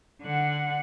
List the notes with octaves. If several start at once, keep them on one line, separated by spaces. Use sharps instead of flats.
D3 F#5